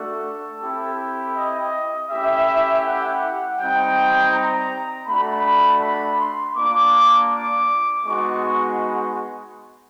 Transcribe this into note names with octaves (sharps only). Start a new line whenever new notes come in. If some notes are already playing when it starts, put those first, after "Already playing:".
Already playing: A3 D4 F#4 A4
C4 E4 G4
D#5
A3 C#4 E4 G4 E5
F#5
G3 C4 D#4 G5
A#5
A3 D4 F#4 B5
B5
C6
A#3 D4 F4 D6
D6
G#3 B3 D#4 F#4 C#6